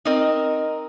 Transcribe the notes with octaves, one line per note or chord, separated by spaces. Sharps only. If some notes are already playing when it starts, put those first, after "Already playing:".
C4 D#4 A#4 D#5